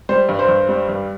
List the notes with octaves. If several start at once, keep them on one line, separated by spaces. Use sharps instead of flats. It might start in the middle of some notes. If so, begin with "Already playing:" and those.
G3 C5
G2
C5
G2
G3
G2